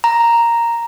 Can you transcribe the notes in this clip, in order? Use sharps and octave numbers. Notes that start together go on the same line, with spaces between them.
A#5